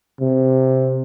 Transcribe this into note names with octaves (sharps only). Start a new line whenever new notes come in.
C3